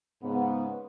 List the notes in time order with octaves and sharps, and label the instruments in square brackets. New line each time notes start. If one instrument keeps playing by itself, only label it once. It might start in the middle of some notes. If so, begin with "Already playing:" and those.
[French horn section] G#2 C#3 B3